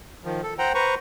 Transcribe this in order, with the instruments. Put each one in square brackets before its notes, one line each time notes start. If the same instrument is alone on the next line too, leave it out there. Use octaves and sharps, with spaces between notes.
[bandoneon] D#3 F3
A4
C5 F#5 G5 A#5
B4 C5 A#5 C#6